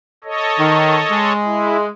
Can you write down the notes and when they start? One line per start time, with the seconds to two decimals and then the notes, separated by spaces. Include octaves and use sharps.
0.24 A4 C#5 D#5
0.59 D#3
1.11 G#3
1.44 E4